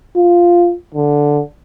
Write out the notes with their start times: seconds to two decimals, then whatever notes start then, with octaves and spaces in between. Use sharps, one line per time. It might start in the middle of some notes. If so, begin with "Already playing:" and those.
0.17 F4
0.94 D3